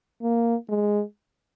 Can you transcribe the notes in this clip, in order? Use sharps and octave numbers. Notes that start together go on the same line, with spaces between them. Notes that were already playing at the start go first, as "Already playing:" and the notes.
A#3
G#3